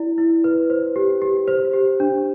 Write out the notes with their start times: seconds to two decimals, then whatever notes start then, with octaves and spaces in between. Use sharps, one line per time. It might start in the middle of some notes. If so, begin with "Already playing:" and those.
Already playing: E4 D5
0.18 E4
0.44 B4
0.70 C5
0.96 G4
1.22 G4
1.48 C5
1.73 G4
2.00 D4